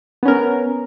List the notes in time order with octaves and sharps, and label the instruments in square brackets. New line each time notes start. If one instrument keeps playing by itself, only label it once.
[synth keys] B3
C#4
A#4